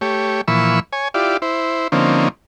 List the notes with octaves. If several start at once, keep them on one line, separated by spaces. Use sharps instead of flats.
A3 G4 C#5
A#2 E3 F3 B5 C#6 E6
C#5 G#5
E4 F4 G4 D5
E4 C5
D3 F3 A#3 C4 C#4 D#4